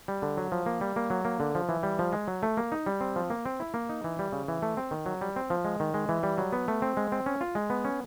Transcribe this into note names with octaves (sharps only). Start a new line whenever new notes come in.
G3
D3
F#3
F3
A#3
G3
A#3
F#3
A#3
D3
F3
E3
G3
F3
G#3
F#3
A3
A#3
D#4
G3
C4
F3
A#3
C4
E4
A#3
D#4
E3
G3
C#3
E3
A3
C4
D#3
F#3
G3
C4
F3
G#3
D#3
G#3
E3
G3
F#3
B3
A3
C4
G#3
C4
C#4
F4
G#3
B3
C#4